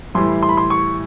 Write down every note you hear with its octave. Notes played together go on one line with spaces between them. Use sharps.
A2 E3 G3 C6
C6
B5
C6
C#6